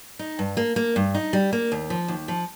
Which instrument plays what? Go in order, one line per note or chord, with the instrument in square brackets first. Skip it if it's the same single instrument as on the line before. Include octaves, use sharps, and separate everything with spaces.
[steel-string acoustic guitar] D#4
G2
A#3
A#3
G2
D#4
G3
A#3
D#2
F3
D#2
F3